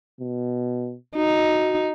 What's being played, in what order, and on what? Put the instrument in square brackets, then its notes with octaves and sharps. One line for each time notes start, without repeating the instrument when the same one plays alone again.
[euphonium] B2
[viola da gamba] D#4 [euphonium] F#4